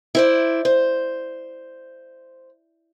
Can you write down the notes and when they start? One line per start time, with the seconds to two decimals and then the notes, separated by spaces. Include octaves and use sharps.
0.15 E4 C5 D5
0.65 C5